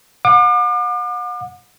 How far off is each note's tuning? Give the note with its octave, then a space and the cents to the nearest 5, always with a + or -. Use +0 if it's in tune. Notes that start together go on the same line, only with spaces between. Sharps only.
F#5 -40 D6 +40